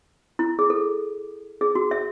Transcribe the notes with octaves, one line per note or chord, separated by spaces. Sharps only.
E4
G#4
A4
G#4
F#4
E5